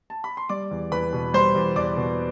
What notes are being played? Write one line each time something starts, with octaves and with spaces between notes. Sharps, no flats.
A5
B5
C6
G3 D5 D6
E2
E2 B4 B5
B2
G3 C5 C6
E2
E2 D5 D6
B2